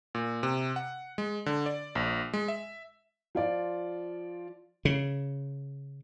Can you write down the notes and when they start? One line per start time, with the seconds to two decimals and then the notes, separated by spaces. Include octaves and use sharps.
0.15 A#2
0.43 C3
0.76 F#5
1.18 G#3
1.46 D3
1.66 D5
1.95 A#1
2.33 G#3
2.48 E5
3.35 F3 F4 D5
4.85 C#3